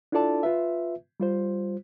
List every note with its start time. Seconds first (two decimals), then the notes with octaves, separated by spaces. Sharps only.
0.12 D4 E4 F4 A4 D5 A5
0.43 F4 B4 E5
1.20 G3 F4 C5